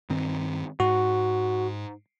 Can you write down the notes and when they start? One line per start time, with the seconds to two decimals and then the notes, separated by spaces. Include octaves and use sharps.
0.10 G2 D#3 C4
0.80 G#2 F#4